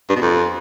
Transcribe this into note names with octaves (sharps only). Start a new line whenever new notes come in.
G2
B2
F2